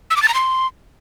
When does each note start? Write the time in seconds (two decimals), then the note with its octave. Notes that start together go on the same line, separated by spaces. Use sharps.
0.10 E6
0.16 D6
0.22 A6
0.28 A#5
0.34 C6